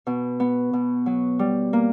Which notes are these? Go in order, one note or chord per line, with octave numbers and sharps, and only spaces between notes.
B2
B3
B2
F#3
G3
A#3